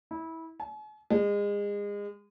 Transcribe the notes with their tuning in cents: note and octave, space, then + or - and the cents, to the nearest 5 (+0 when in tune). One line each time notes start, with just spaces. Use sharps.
E4 -20
G#5 +45
G#3 -30